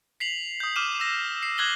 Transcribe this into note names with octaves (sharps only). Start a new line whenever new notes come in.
B6 C7 F7 F#7
D#6 G6
D6 F6 D#7 E7
E6 A#6
C7
D6 F#6 G#6 A#6 F#7 G7